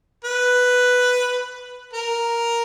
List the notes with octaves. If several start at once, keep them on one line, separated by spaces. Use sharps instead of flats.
B4
A#4